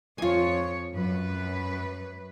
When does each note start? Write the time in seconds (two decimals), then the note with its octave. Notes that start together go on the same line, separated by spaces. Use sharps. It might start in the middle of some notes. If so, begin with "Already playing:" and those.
0.18 F2 F4 C#5 G#5
0.93 F#2 B4